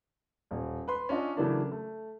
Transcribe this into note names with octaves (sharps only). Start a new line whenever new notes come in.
D#1
B4 C6
C#4 D4 F4 D#5
C#3 E3 F#3 A3 A#3 D4
A3